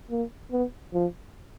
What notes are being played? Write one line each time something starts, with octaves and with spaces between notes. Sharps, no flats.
A#3
B3
F3